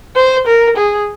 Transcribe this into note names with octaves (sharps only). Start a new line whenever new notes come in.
C5
A#4
G#4